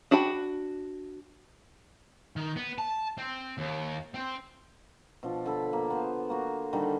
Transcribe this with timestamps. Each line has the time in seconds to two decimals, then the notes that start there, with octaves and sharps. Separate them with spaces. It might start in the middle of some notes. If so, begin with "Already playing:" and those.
0.11 D4 F#4 G5 B5
2.36 D#3
2.56 B3
2.78 A5
3.18 C4
3.58 D#2
4.14 C4
5.23 B2 F3 D4
5.45 D3 A4 B5
5.73 A#3
5.90 B3 C5
6.30 A#3 F#4
6.73 D3 D#3 G3